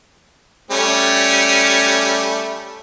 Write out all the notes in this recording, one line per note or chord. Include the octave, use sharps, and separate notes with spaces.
G3 A3 C#4